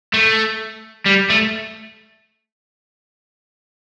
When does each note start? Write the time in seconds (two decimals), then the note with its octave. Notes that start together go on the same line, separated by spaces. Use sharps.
0.14 A3
1.06 G3
1.30 A3